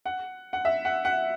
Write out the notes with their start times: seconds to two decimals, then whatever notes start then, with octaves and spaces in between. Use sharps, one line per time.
0.06 F#5
0.53 F#5
0.65 E5
0.85 F#5
1.05 F#5